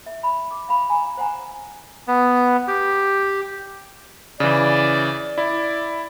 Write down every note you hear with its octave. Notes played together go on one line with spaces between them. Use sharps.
E5
B5
D6
F5 B5
G#5 A#5 B5
C5 F#5 G#5 A#5
B3
G4
C#3 E3 D5
E4 D5